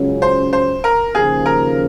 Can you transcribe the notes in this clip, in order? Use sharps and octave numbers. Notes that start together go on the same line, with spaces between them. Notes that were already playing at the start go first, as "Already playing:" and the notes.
Already playing: C#2 C#3 F#3 C#4
C5
C5
A#4
D#2 C#3 F3 A#3 G#4
A#4